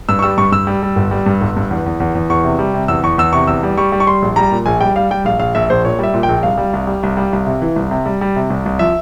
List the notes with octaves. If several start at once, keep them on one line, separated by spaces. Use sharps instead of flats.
G2 E6
C#6
G3 E6
G2 C#6
G2 E6
G3
G3
G1
G3
G2
G1
G2
E2
E2
E2
E2
E2 C#6
C3
G3
C3
E2 E6
E2 C#6
E2 E6
C3 C#6
E2 E6
G3
G3 C#6
G3
C#6
G3 C6
A#1
G3 A#5
A#2
A#1 G#5
G3 G5
G3 F5
G3 G5
A#1 F5
A#1 F5
A#1 E5
A#1 C5
A#2 C#5
G3 E5
A#2
G5
A#1
C2 F5
G3
C2
G3
C2
G3
C2
C3
E3
C2
C3
G3
G3
C3
C2
C2
F3 E5